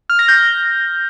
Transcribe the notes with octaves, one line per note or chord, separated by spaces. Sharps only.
F6
A#6
G6